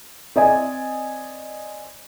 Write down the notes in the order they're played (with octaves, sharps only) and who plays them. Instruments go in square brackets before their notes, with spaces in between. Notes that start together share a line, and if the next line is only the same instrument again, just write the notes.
[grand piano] C4 D5 D#5 G#5